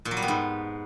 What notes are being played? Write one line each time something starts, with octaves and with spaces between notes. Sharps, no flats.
A#2
F#3
G3
B3
G#2